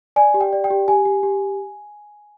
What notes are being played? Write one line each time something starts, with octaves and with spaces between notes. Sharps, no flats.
D5 G#5
G4
G5
D5
G5
G4
G4 G#5
G4
G4